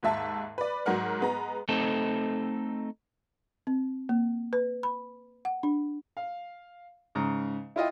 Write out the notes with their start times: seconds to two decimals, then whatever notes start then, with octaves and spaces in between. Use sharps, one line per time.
0.03 D#2 G#2 E5 A5
0.58 B4 D5
0.86 G#2 F#3 A#4 F#5 F6
1.20 G#3 B3 A#5
1.69 A3 C4 D#4 A4
3.67 C4
4.09 A#3
4.53 B4
4.83 B5
5.45 F#5
5.63 D4
6.17 F5
7.15 G#2 C#3 A#5
7.76 E4 F4 D#5 G5